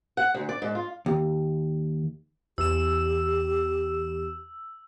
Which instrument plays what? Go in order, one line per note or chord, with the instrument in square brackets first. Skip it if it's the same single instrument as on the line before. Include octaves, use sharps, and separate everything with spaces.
[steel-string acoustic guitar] F#5
D2
D5
G#2
F4
[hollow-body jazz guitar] D#2
[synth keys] E2 E7 [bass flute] G4 [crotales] E6